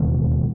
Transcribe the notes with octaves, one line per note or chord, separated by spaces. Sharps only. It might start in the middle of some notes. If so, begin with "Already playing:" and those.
Already playing: E1 D#2 C#3 E3